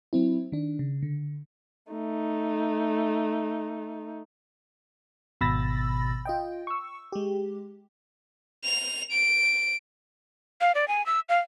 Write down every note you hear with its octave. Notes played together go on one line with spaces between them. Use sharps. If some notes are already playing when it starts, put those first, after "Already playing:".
F#3 C4 E4
D#3 D4
C#3
D3
A3 D#4
G#1 B2 B5 E6 A6 A#6
F4 D#5 G5
C#6 E6
G#3 G4
F7
D7
F5
D5
G#5
E6
F5